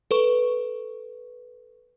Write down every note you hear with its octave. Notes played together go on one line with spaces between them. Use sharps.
A4 B4 C#6